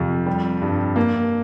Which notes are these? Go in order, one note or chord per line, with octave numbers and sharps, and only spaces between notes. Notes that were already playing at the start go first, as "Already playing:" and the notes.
Already playing: F2 C3 F3
G3
G2
A#3